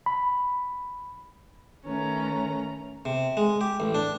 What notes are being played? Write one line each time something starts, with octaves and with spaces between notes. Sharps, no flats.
B5
D#3 A3 C#4 B4 A#5
C3
G#3
G4
A1
D4